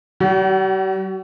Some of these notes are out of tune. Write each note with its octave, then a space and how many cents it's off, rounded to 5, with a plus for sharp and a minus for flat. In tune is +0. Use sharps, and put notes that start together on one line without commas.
G3 -45 F#4 +30